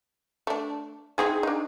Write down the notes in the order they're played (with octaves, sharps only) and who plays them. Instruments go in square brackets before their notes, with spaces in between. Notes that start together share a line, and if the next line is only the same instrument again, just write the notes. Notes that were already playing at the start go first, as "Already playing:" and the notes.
[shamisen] A3 D4
[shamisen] C4 D#4 E4 [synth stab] G#4
[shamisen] D4 D#4